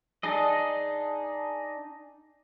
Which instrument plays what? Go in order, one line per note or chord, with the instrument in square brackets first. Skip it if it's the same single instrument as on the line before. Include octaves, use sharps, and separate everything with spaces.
[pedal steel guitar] D4 D#4 G#4 D#5